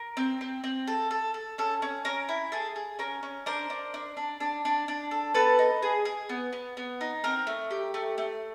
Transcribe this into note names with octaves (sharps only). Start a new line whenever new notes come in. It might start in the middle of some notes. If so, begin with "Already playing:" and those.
Already playing: A#4
C4
C4
C4
A4
A4
A4
C#4 A4
C#4
C#4 A#4
E4
G#4 A4
G#4
C#4 A#4
C#4
D4 A#4 C5
D4
D4
D4
D4
D4
D4
A4
B3 A4 B4
D#4
G#4
G#4
B3
B3
B3
D#4
C4 A#4
A3
G4
A3
A3